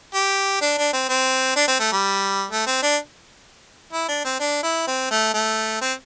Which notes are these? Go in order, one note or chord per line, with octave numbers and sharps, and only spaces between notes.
G4
D4
D4
C4
C4
D4
C4
A3
G3
A3
C4
D4
E4
D4
C4
D4
E4
C4
A3
A3
C4